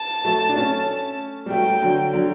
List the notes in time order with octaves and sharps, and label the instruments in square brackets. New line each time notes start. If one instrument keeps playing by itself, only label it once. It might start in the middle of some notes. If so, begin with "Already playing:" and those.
Already playing: [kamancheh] A5
[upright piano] F#3 A3
D4
A3 C#4
G3
[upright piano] F#3 A3 [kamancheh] G5
[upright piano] D3 F#3
D3 F#3